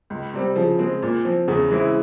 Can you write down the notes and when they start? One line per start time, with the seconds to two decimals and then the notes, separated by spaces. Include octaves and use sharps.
0.10 C#2
0.33 C3 G3 C4
0.56 C#3 F3
0.79 G#3 C4
1.02 A#2
1.25 F3 C4
1.48 E2 C#3
1.70 E3 G#3 C4 E4